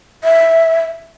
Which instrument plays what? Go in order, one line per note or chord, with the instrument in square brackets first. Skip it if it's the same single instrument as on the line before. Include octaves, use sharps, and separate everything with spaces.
[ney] E5